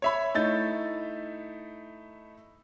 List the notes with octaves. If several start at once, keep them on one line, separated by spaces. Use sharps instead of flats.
C#5 E5 B5
A3 D#4 E4 G6 A6